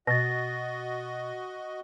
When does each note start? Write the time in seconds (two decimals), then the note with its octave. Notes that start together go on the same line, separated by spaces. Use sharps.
0.07 B2 F#4 D#5 A6 A#6